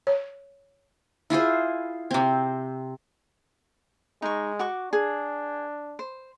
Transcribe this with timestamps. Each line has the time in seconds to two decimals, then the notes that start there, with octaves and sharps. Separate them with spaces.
0.07 C#5
1.30 E4 F4 G#4 C5
2.11 C3 C4
4.22 G#3 D#4 C#6
4.59 F#4 C#6 D6
4.93 D4 G#4
5.99 C5